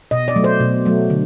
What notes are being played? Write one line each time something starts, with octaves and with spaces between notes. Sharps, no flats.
B2 D#5
D5
F#3 A3
C5
B2
F#3 A3
D3